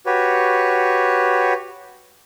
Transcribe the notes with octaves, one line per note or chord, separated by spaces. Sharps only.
F#4 G4 B4 C#5